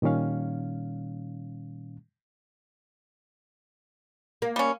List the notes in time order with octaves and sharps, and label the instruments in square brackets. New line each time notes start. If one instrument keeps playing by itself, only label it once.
[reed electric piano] A#2 D#3 G3 C#4 F5
[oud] A#3
[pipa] G3 C#4